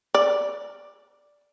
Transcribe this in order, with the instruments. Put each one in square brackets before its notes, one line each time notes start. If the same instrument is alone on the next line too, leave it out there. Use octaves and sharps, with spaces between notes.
[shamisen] D5